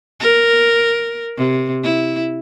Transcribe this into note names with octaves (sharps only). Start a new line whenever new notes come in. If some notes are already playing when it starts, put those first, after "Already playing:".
A#4
C3
E4